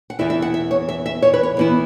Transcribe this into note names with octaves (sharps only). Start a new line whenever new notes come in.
F#5
E2 E3 B3 E4 E5
E5
F#5
E5
C#5
E5
E5
C#5
B4
C#5
E2 E3 B3 E4